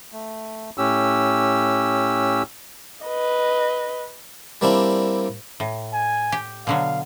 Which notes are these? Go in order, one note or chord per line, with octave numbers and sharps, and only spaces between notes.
A3
A2 C#4 G4 E6
B4 D#5
G3 A#3 C4 D4 E4
A2
G#5
G4
B2 D3 F#3 F5